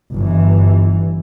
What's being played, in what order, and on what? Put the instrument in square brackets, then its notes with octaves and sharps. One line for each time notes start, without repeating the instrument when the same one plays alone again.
[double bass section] G1 E3